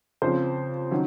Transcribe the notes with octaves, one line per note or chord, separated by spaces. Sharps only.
F2 C#3 F3 C5
D#3 F#3 C#4